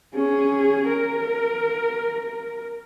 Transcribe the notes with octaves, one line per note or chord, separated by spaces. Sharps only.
C#4 G#4
A#4